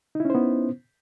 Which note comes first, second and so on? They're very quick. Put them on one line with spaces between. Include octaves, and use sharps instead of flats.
D#4 E4 C#4 C5 B3